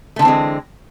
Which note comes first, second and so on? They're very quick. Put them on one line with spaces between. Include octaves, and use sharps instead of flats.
A3 D3 E3 C4 G#3